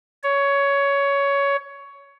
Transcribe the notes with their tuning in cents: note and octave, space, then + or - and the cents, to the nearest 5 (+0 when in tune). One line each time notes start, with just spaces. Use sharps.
C#5 +15